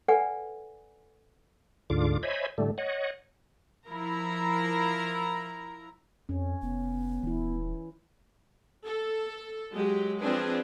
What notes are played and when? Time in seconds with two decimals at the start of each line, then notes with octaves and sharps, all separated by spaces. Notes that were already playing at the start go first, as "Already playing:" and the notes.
0.08 A4 B4 D5 F#5 G#5
1.90 D2 G#2 D3 F4 D6
2.23 C5 C#5 D#5 E5 G#5 B5
2.58 A2 D3 G3 A3
2.78 C#5 D#5 F#5
3.89 F3 E4 A#4 A#5
6.29 F2 C#4
6.62 F1 B3
7.23 D#1 E3 E4
8.86 A4
9.72 F#3 G#3 G4
10.21 F3 C4 D4 G#4 B4